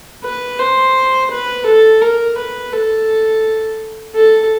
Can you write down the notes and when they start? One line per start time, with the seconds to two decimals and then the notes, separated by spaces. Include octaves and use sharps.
0.24 B4
0.59 C5
1.30 B4
1.66 A4
2.01 A#4
2.37 B4
2.73 A4
4.14 A4